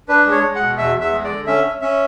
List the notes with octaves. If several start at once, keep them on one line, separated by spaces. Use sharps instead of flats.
D4 B4
G#3
C#5
G#3
F#5
B2
E2 E5
E2
E5
G#3
D5
D3
C#4 E5
C#4
C#4 E5